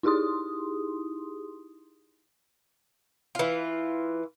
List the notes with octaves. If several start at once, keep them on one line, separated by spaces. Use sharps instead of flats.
D#4 E4 G4 G#4 C6 D#6
E3 F4